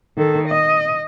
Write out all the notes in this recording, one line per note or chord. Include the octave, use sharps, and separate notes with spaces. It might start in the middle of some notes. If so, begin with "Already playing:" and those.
D#3 A4
D#5